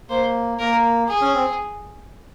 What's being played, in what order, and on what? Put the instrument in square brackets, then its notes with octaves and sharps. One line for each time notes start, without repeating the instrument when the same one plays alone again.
[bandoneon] A#3 [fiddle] C5
[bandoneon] A#3 [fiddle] A#4
[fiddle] G#4
[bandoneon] C#4
C4